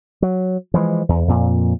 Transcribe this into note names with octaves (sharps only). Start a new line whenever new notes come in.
F#3
E3 F3 G3 G#3
E2
F2 A#2